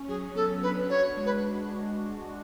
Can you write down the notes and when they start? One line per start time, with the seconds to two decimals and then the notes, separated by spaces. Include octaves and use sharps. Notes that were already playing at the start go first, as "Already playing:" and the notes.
Already playing: C#4
0.08 F#3 G#4
0.35 B3 A4
0.63 D4 B4
0.90 F#4 C#5
1.17 G#3
1.26 B4